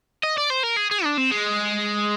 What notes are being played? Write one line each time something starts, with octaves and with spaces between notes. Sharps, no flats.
D#5
D5
C5
A#4
G#4
G#4
D4
C4
G#3